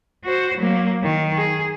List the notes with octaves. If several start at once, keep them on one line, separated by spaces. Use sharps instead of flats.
F#4 C5
F#3 A#3
D#3
G#4